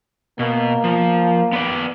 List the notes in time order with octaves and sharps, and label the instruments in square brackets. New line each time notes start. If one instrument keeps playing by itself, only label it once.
[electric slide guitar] B2 [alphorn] A#3
[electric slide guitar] F3
B3 B4 D5